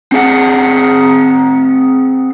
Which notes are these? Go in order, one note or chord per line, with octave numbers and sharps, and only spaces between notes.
C4 G#4 F#5